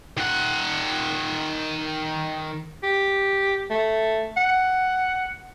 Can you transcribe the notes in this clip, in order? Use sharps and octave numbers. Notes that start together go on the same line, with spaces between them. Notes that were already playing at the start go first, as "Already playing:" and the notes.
D#3 F#5
G4
A3
F#5